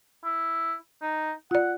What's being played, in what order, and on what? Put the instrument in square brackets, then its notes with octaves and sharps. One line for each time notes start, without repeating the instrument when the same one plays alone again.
[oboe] E4
D#4
[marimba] F4 D5 [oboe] F#5